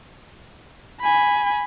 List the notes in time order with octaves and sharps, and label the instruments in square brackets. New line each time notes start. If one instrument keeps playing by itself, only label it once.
[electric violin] G#5 B5